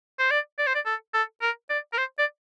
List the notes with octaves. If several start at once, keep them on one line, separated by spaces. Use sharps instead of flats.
C5
D5
D5
C5
D5
A4
A4
A#4
D5
A#4
C5
D5